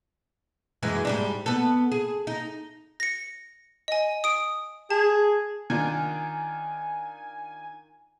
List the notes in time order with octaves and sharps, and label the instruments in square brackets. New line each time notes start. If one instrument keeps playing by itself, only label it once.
[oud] F#2 E3 G#3
G#2 G3 D4
B3 A4
G#4
D#4
[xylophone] A#6 C#7
D#5 G#5
D#6 D7
[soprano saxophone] G#4 [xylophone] A5
[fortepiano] D#3 D4 F4 [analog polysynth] G#5